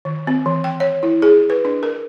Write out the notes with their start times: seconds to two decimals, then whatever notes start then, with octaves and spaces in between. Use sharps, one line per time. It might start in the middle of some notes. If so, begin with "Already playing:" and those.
0.05 D#3
0.27 C4
0.46 E3
0.64 G5
0.80 C#5
1.03 E4
1.22 G#4
1.50 B4
1.65 D4
1.83 A#4